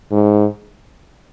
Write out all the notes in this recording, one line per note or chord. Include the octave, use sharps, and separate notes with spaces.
G#2